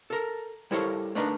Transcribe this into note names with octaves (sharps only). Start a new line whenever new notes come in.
A4 A#4
G3 E4 A4 A#4 C5 C#5
A3 D4 D#4 A#4 B4